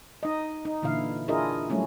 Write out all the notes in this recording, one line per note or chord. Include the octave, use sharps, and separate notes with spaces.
D#4 D#5
D#4
A#2 D3 E3 E4 F5
D4 E4 F4 G#4 A#4 D#5
F#3 G3 A3 C#4 E4